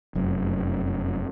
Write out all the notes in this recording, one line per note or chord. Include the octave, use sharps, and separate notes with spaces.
F1 F#2